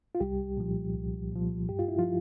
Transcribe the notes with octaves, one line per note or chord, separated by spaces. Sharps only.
F4
C2 G3 G4
A#2 F3
C2
A#2 F3
G2 G4
F4
E4
F3 F4